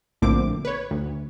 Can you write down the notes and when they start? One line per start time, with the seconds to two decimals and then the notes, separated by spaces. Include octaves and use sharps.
0.22 A#1 A2 D3 A#3 C4 D6
0.65 B4 C#5
0.91 D2